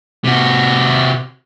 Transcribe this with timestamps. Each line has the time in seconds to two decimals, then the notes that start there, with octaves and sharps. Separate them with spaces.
0.24 C3 F#4